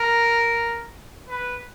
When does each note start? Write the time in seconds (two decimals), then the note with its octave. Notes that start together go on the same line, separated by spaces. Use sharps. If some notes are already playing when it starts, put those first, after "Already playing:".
Already playing: A#4
1.28 B4